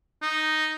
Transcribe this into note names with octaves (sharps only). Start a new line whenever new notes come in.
D#4